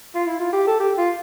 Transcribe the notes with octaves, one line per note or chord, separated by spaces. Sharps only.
F4
E4
F4
G4
A4
G4
F4